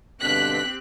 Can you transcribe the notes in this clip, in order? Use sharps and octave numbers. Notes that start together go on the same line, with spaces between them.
G2 B2 D3 C4 G4 F#6 B6